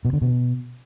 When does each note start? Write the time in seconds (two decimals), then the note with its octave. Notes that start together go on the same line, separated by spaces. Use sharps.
0.05 B2
0.13 D3
0.22 B2